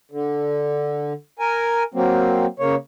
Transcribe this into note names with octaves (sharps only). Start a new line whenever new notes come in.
D3
A#4 G#5
F#3 A#3 C4
C#3 A#3 C#5